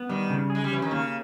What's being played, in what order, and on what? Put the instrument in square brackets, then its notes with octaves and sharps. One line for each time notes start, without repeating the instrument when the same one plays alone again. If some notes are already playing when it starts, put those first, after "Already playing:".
Already playing: [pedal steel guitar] B3
[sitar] D#3 [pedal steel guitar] G3
[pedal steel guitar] C#3
[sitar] G#3 [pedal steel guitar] G#4
[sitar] G3
[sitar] E3 [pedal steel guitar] C#4
[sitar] D#3
[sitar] C#3 [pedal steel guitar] A#3